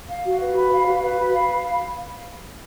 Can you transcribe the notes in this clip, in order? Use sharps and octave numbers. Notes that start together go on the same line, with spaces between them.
F5
F#4
B4
B5
F5
F#4
B4
B5
F5